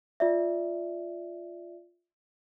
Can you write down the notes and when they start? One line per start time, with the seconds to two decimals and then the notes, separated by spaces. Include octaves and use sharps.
0.20 F4 D5 E5